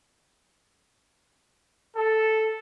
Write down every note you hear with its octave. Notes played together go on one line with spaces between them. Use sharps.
A4